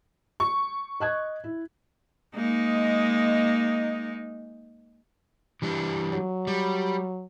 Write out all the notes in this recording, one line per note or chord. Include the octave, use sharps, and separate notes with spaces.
C#6
D#5 F#6 G#6
E4
G#3 A#3 D#4
E3 G3 D4
F#3
G3